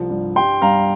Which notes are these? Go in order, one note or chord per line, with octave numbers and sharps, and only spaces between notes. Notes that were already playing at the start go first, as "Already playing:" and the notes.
Already playing: C2 F3
G2
G3 G5 C6
G2 F5 A#5